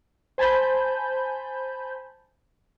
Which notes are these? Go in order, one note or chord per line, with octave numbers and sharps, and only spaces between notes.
C5 G#5 A5 B5 G6